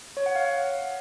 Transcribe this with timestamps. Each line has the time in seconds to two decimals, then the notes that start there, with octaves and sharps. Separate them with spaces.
0.17 C#5
0.26 F#5
0.36 F5
0.45 F#5